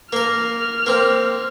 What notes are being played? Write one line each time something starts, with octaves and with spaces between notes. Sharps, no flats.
A#3 A#4 F6
A#3 C4